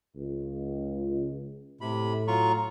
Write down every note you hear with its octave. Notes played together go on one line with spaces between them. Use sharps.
C#2
A2 C3 B5
F#3 F4 A#5 C#6